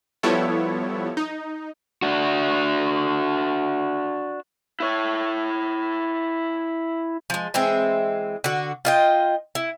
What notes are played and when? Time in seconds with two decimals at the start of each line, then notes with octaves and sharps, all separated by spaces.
0.23 F3 G3 B3 E4 A4 C#5
1.17 D#4
2.02 D4 F#4
4.80 E4 C#5
7.30 F3 G#3
7.54 E3 G#3 C4 E5
8.44 D3 F#4
8.85 F4 D#5 G5
9.55 E4